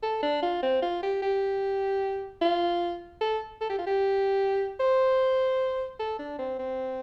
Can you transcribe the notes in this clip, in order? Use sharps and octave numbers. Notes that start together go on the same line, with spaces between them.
A4
D4
F4
C4
F4
G4
G4
F4
A4
A4
G4
F4
G4
C5
A4
D4
C4
C4